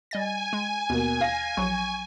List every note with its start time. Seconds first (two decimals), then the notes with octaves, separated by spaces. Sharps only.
0.11 G3 D#5 G#5 A6
0.53 G#3
0.90 D#2 B2 A#3
1.21 F5 A#6
1.57 A#1 F#3 C#6